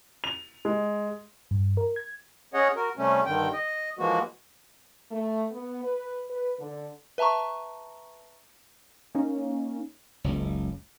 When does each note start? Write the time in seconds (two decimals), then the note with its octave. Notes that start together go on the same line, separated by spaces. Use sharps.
0.24 F7
0.65 G#3
1.51 G2
1.77 A#4
1.96 G#6
2.54 C#4 G#4 C#5 D#5 F#5
2.76 F#4 A#4
2.97 C3 G3 A3 C#4
3.25 G2 D3 D#3 G5
3.53 D#5
3.99 E3 F3 G#3 A#3 F#4
5.11 A3
5.51 B3
5.84 B4
6.30 B4
6.60 D3
7.18 B4 E5 A5 A#5 C#6
9.15 A#3 C#4 D#4
10.24 F#1 C#2